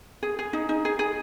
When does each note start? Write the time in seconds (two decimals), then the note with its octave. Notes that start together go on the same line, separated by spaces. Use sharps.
0.23 G#4
0.39 G#4
0.53 D#4
0.69 D#4
0.85 G#4
0.99 G#4